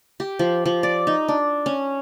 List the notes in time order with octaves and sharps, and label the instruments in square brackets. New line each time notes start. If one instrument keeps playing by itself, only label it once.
[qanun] G4
F3
F3
D5
D#4
D4
C#4